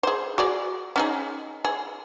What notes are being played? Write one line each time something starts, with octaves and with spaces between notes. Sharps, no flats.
G#4 C5
F#4 G#4 D5
C#4 D#4 G#4
G#4